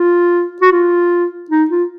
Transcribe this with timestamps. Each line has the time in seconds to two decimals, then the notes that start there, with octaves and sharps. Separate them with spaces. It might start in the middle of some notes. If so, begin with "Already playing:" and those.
Already playing: F4
0.62 F#4
0.72 F4
1.50 D#4
1.70 F4